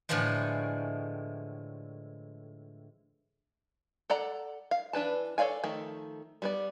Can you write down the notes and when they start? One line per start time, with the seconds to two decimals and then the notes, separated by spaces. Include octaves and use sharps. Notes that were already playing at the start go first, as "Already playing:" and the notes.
0.09 A2 D3 E3 F3 G#3
4.10 A4 D5 F#5 A#5
4.71 F5
4.93 E3 D4 B4 A5
5.38 A4 C#5 D5 F5 G#5
5.64 D#3 F3 A3
6.42 G3 B3 D5